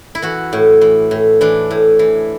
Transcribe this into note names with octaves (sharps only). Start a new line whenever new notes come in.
E4
E3 F#4
A2
E3
A2
E3 D4
A2
E3